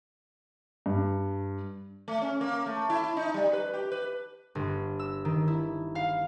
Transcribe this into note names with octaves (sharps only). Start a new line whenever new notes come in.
G2
A3
C#4
A#3
A3
E4
E4
D#4
G3
B4
G4
B4
G1
E6
D#3
E4
F5